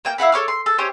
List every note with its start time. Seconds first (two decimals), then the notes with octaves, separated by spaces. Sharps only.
0.05 A#3 G5 G6
0.18 E4 F5 F#5 B5
0.32 A4 C#5 D6 F6
0.48 C6
0.66 A4
0.78 C#4 G4 C5 C#5